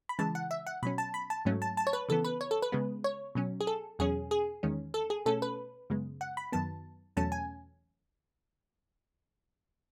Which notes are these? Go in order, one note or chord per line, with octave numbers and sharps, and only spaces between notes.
B5
C#3 E3 G#3 A5
F#5
E5
F#5
B2 F#3 C#4 B5
A5
B5
A5
G#2 F#3 A3 C#4
A5
A5
C#5
B4
C#3 E3 B3 A4
B4
C#5
A4
B4
C#3 G#3 B3
C#5
B2 F#3 C#4
G#4
A4
E2 B2 F#3 C#4 G#4
G#4
E2 D#3 G#3 C#4
A4
G#4
B2 A3 C#4 A4
B4
F#2 C#3 G#3 B3
F#5
B5
F#2 D#3 F#3 B3 A5
E2 B2 F#3 A3 C#4 A5
G#5